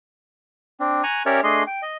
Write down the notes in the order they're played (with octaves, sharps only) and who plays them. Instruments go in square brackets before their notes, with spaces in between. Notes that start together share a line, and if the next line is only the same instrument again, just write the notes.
[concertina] C4 D4
G#5 A#5 C#6 F#6
C#4 G4 A#4 C#5 D5 E5
A3 D4 G#4 D#5 C6
G5
D#5